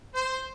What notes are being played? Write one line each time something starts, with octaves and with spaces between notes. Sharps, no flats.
C5